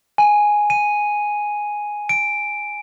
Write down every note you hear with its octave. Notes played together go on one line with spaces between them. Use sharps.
G#5
D#7
D7